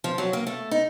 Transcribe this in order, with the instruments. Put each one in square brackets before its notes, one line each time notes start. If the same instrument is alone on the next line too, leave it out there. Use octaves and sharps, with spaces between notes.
[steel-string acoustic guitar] F3
F#3
A#3
A3
D#4